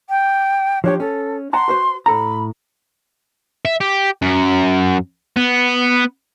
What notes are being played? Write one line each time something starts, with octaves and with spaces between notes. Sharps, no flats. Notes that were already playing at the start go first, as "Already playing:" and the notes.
G5
F3 D4 G4 C#5
C#4 A4
F#5 A5 A#5 C6
F#4 B4 C5
A2 A4 A#5 B5
E5
G4
F#2
B3